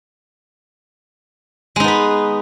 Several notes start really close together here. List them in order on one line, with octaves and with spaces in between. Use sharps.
G#3 D#4 B3 B4